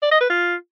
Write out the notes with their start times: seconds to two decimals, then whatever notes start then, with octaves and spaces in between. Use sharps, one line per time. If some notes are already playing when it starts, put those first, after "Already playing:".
0.02 D5
0.12 D#5
0.21 B4
0.30 F4